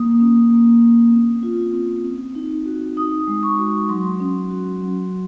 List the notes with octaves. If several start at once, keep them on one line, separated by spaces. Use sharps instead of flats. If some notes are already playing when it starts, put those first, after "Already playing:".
Already playing: A#3 D#6
C#4
A#3
C#4
C4
F4
C4
C4
D#4
F#4
D#4 D#6
G#3
C#6
F#4
F#3 C6
C#4
F#4
F#3